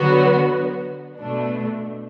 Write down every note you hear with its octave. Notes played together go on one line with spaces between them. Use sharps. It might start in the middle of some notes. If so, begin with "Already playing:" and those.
Already playing: D3 F#3 B3 F#4
B2 A3 D4